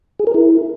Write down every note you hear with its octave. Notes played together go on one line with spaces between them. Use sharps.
G#4
A#4
E4